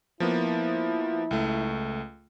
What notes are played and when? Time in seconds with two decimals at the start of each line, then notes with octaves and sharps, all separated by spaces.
0.20 F3 A#3 B3 E4
1.31 C#2 A3